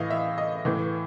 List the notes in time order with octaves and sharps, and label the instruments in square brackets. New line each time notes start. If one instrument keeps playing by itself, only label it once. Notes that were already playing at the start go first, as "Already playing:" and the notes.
Already playing: [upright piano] A2 E3 D#5 F5
E5
D#5
A2 E3